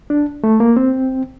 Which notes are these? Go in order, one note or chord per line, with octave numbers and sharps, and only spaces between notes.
D4
A3
A#3
C4